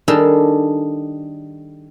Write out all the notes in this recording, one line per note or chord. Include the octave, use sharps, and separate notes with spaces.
D#3 G3 D4 G#4 A4